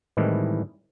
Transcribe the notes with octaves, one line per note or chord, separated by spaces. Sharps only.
A2 D#3 E3 G3 G#3 C4